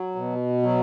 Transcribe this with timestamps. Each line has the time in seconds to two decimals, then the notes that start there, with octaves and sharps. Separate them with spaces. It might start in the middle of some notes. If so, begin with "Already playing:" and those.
Already playing: F#3
0.15 B2
0.62 F#3